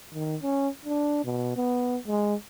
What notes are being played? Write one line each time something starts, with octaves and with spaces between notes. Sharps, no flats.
D#3
C#4
D4
B2
B3
G#3